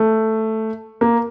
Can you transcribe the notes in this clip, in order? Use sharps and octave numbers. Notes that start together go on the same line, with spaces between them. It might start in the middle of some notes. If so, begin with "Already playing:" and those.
Already playing: A3
A#3